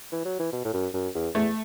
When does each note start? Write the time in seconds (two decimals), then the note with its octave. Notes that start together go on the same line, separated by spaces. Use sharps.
0.12 E3
0.25 F#3
0.39 E3
0.52 B2
0.65 A2
0.73 F#2
0.94 F#2
1.15 E2
1.35 E2 A3